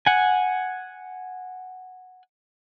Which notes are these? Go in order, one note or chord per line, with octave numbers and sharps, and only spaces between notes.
F#5 G#5